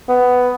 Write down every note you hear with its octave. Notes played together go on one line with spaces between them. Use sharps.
B3